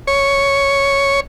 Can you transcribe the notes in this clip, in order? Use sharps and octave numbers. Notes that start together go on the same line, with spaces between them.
C#5